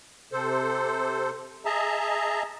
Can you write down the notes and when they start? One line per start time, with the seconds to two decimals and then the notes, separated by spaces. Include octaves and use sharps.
0.32 C3 A4 C5
1.65 G#4 D#5 E5 A5 A#5